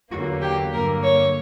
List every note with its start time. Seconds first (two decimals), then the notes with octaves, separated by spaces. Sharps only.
0.11 E2 D3 F#3 A#3 F#4
0.41 G4
0.72 G2 D3 F#3 A#3 A#4
1.03 C#5